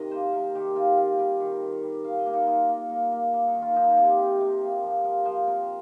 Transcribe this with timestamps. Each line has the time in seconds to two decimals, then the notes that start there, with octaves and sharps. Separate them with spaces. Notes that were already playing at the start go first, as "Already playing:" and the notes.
Already playing: C3 D#3 A#4 D#5
0.11 A#3 C5
0.33 C3 A#4
0.55 D#3 G4
0.75 C4 F4
0.97 C4 F4
1.19 G3 G4
1.40 D#3
1.62 D#3
1.83 G3
2.04 D#3 F5
2.19 D#5
2.26 A#3
2.33 D#4
2.47 D#4 F4
2.69 A#3
2.90 A#3
3.12 A#3
3.33 A#3
3.48 D#4
3.55 D#3
3.62 F4
3.76 F3 D#4
3.90 F4
3.97 C3
4.05 G4
4.19 C3
4.41 C3
4.61 A#3
4.83 F3
5.04 F3 A#4
5.25 F3 C5
5.47 C4 A#4